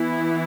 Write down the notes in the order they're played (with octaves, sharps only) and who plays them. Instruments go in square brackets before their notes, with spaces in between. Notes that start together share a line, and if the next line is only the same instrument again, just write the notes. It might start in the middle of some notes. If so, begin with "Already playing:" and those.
Already playing: [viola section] E3 B3 E4